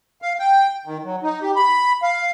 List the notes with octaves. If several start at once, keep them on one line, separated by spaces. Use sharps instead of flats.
F5
G5
D#3
F#3
D#4
G4
B5
F5